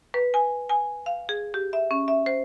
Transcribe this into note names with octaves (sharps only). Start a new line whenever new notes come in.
B4
G#5
G#5
F5
G#4
G4
E5
C#4
E5
C5